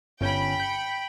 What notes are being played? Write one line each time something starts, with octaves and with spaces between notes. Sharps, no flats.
G1 C#4 G5 B5 G6
G6 C#7